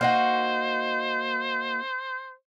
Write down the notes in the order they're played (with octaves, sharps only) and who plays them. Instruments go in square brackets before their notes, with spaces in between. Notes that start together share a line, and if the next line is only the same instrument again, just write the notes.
[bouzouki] A#3 D#4 F#4 [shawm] C5